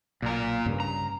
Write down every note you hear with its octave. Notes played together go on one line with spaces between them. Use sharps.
B1 A#2 A#4
G2 C#3 G3
A#5